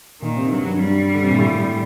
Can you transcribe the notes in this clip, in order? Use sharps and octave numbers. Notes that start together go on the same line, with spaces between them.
A#2 D#3
C3
G2 F#3
G2
G2 G3
D3
C3
A#2
A2